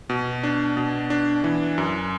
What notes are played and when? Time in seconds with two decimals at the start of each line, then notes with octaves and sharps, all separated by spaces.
0.09 B2
0.43 D4
0.77 B2
1.10 D4
1.44 E3
1.78 F#2